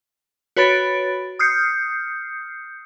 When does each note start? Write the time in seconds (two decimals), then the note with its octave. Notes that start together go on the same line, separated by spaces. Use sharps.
0.56 F#4 B4 C#5 B5 A6 D7
1.39 D#6 F6 G6 C7 C#7